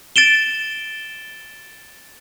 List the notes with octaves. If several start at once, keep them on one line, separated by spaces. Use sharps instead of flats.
A6 D7 E7 G7